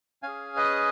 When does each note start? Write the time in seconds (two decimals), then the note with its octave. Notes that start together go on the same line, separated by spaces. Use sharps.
0.23 C#4 G#4 F5 G#5
0.56 B4 D#5